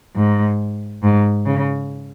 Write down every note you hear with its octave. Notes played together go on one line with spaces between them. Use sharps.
G#2
G#2
C#3